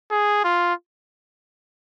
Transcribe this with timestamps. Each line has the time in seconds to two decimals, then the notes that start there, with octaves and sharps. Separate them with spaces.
0.11 G#4
0.45 F4